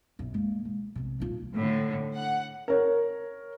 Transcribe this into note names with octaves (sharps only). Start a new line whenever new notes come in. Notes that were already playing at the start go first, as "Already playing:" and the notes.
B1 F#2
G#3 A#3
G#3
B1 C3
D#1 F4
A2 D3
F#5
A#4 C#5